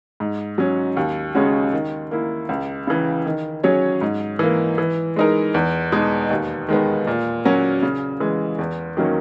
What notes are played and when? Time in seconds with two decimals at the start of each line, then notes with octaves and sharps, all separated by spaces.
0.20 G#2
0.58 F#3 C#4
0.97 D#2
1.35 C#3 G#3 C#4 F#4
1.73 D#3
2.11 A#3 E4
2.49 C#2
2.87 C#3 E3
3.26 D#3
3.63 F#3 C#4 G#4 C#5
4.01 G#2
4.39 E3 A#3
4.78 E3
5.16 G#3 D#4 A#4
5.54 E2
5.92 B2 G#3 D#4
6.30 D#2
6.69 D#3 G#3 B3
7.07 A#2
7.45 F#3 C#4 F#4 A#4
7.83 C#3
8.20 E3 G#3
8.59 E2
8.97 D#3 F#3 A#3 C#4